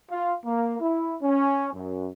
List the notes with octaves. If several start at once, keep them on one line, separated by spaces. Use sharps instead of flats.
F4
A#3
E4
C#4
F#2